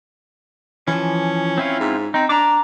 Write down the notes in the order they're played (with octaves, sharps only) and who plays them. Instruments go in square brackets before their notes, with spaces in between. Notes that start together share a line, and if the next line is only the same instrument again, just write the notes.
[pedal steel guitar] E3 F3 [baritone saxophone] C#4
[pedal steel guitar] C4 E4 F4
[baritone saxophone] G#2
[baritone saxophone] C4 [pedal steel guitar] D#4
[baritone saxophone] D4 [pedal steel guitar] A#5 D6